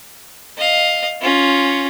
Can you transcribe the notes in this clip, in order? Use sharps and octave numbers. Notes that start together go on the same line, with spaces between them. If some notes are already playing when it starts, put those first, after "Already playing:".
D#5 F5
C#4 F4